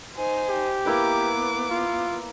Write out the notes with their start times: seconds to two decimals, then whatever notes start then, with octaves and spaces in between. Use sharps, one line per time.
0.16 D#4 C5 G#5
0.49 G4
0.86 A#3 B3 E4 B4 D6
1.70 F4